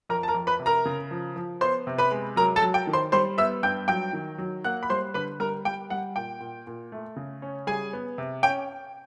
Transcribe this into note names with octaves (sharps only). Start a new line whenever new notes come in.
F2 A#4 A#5
A5
A#4 A#5
F2
B4 B5
C3
A#4 A#5
C#3
F3
F3
B3 C5 C6
C3
B4 B5
G#3
F#3 A#4 A#5
A4 A5
F#3
G5
D#3
C5 C6
G3 C5 C6
B3 E5 E6
G2 G5 G6
F#3 G5 G6
D#3
F#3
A#3 F#5 F#6
B5
G3 C5 C6
D3 B4 B5
G3 A#4 A#5
G3 G5
G3 F#5
A#2 G5
A#2
A#2
A3
C#3
C#4
G3 G#4 G#5
B3
C3
C#4 G5